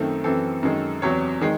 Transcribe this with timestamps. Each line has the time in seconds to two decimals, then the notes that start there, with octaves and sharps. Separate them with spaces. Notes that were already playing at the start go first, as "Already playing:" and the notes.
Already playing: F#2 D#3 A3 C4
0.24 F#2 E3 C4 A4
0.63 F#2 D#3 G#3
1.02 E2 C3 F#3 C#5
1.41 D#3 G#3